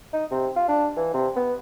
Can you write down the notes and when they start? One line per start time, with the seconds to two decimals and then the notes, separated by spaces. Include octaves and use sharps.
0.13 D#4
0.31 C3
0.56 F4
0.68 D4
0.96 E3
1.14 C3
1.36 B3